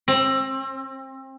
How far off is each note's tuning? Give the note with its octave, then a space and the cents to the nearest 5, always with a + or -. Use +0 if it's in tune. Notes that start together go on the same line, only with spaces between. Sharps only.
C4 +30